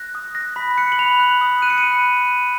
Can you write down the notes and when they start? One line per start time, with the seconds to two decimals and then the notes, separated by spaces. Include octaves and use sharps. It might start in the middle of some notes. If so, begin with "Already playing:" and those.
Already playing: F#6 A#6
0.15 D#6
0.35 F#6 A#6
0.56 B5 B6
0.78 F#6 C#7
0.92 F#7
0.99 B5 F7
1.20 F#6
1.41 D#6
1.62 F#6 D#7
1.70 C#7
1.78 D#7
1.84 B5
2.05 F#6